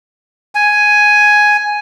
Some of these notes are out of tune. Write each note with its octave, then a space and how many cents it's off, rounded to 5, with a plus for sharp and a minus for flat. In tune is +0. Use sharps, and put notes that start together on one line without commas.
G#5 +5